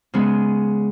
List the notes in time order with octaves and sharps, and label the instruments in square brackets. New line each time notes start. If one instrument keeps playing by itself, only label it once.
[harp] C#3 G#3 B3